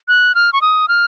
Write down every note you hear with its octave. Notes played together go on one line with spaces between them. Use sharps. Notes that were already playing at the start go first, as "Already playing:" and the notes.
F#6
F6
C#6
D#6
F6